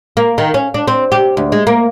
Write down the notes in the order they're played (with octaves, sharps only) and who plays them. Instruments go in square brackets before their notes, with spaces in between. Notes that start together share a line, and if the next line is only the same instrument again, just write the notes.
[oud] A#3
D#3
C#4
D4
C4
G4
D2
G#3
A#3